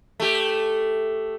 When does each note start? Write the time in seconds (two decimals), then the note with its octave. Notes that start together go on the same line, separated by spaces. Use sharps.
0.20 A3 G4